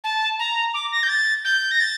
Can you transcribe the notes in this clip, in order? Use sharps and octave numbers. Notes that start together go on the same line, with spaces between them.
A5
A#5
D6
A#6
G6
A6
G6
A#6
A6